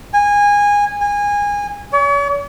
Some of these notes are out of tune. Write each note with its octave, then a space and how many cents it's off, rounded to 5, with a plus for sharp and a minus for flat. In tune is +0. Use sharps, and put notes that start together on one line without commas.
G#5 -20
G#5 -25
C#5 +45